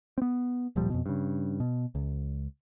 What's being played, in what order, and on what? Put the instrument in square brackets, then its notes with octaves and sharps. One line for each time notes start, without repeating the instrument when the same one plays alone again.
[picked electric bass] B3 C4
D1 A#2 F3 G3
F2 B2
G2 C#3
B2
C#2